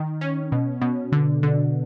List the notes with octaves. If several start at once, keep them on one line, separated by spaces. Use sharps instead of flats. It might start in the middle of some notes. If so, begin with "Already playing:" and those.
Already playing: D#3
C#4
B2
B2
D3
D3